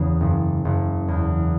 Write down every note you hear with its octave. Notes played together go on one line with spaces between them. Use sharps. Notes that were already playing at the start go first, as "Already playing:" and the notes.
Already playing: E2 C#3
F#1
F#1
E2